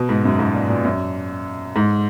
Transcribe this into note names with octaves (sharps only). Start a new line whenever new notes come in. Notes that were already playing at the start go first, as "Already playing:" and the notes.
Already playing: B2
G#2
F#2
G#2
A#2
A#2
F#2
G#2